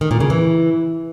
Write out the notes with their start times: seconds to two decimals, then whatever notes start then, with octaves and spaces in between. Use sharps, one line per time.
0.01 D#3
0.11 A#2
0.20 C#3
0.30 E3